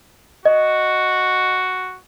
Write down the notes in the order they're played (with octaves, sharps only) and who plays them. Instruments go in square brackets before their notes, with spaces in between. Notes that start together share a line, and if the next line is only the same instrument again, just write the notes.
[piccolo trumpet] F#4 [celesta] D#5